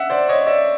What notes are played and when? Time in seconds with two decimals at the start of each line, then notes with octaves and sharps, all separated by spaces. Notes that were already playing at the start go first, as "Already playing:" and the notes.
Already playing: E5 F#5
0.10 C5 D5
0.29 C#5 D#5
0.46 D5 E5